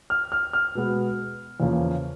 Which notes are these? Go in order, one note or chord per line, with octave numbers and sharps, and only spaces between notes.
F6
F6
F6
B2 G#3 B3
E2 C#3 F3 A#3 C#4